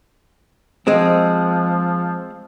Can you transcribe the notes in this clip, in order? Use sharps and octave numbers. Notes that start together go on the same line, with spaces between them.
F3 G#3 C4